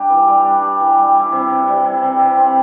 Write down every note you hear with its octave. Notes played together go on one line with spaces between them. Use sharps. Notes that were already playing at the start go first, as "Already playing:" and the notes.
Already playing: G3 D4 G4
E3
G3
D4
G4
E3
G3
E4
C3
C3
G3
E4
C3
C3
C4